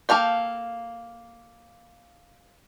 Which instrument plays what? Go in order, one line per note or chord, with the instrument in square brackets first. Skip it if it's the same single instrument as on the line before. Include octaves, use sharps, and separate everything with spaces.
[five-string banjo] A#3 A4 F5 G5